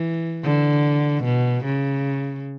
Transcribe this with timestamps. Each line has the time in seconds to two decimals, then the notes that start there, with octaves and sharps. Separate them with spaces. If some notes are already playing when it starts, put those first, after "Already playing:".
Already playing: E3
0.44 D3
1.24 B2
1.65 C#3